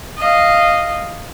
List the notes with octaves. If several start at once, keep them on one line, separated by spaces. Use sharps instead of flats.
D#5 F5